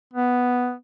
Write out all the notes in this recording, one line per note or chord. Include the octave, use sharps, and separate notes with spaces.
B3